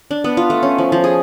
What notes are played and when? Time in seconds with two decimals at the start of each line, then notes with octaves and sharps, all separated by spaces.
0.11 D4
0.24 B3
0.37 F4
0.50 A3
0.63 C#4
0.78 F3
0.92 F3
1.04 G#4